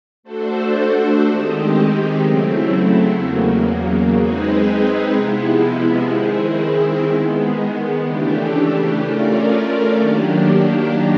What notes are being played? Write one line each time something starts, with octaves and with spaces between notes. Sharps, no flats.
A3 D4 F#4 A4 C5
D#3 G#3 C4 D#4 G4
C#3 F#3 A3 C4 E4
E2 C#3 F#3 A#3
G#3 C4 D#4 G#4 B4
C3 F3 G#3 B3 E4
D#3 G#3 C4 E4 G#4
D#3 G#3 B3
C#3 E3 A3 D4 G4
A3 C#4 F4 A#4 D5
D#3 F#3 A#3 D4 G4